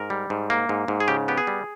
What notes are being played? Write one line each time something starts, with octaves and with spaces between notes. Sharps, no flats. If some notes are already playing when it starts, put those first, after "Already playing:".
Already playing: G#2 A#4
G3
G#2
A#3
G#2
G#2
G#4
C#3 G4
B3 G4
G#4
G3